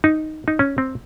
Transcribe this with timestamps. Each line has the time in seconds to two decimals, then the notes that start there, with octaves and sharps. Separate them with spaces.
0.04 D#4
0.48 D#4
0.59 C#4
0.78 C4